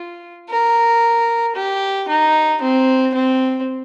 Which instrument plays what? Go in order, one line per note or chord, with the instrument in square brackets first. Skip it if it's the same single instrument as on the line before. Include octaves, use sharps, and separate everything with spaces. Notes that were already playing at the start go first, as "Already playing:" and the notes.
Already playing: [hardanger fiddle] F4
A#4
G4
D#4
C4
C4